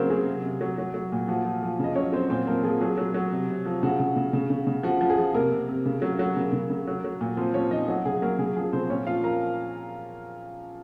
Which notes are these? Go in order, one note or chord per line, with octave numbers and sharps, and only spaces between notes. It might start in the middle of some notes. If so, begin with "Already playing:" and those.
Already playing: C#3 F#3 A#3 C4 A#4 C5
F#3 G#4
C3
C3
F#3
F#3
F#3
A#2
F3 F#4
F3
F3
C#3 D#5
F#3 C#4 C#5
F#3 C4 C5
A#2 C4 C5
F3 A#3 A#4
F3 G#4
F#3 G#4
F#3
F#3
C3
C3
F3
C#3 F#4
C#3
C#3
C#3
C#3
C#3
F3 F#4
F3
G#4
F3
C3 A#3 A#4
C3
C3
C#3
F#3
F#3
C#3
C#3
C#3
F#3
F#3
A#2
F3 C4 C5
F3 C#4 C#5
F3 D#4 D#5
F#3 F#4
C#3 G#4
F#3 A#3 A#4
C#3 G#4
F3 G#4
C#3 C4 C5
A#2 C#4 C#5
F3 F4 F5
F3 A#4 A#5